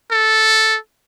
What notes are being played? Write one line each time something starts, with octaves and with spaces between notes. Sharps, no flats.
A4